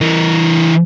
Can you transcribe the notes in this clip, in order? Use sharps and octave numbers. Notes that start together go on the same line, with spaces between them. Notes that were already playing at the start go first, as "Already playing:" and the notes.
E3 A#4